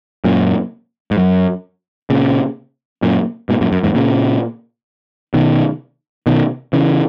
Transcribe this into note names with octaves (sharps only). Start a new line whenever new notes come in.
F#2 A#2
G#2
F#2
A#2 C#3
F#2 A#2
G#2 B2
F#2 A#2
F#2
E2 G#2
A#2 C#3
B2 D#3
B2 D#3
C#3 E3